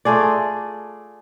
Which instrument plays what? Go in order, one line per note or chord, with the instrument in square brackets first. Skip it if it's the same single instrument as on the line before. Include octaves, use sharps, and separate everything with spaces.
[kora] A3 F4 G#4 D5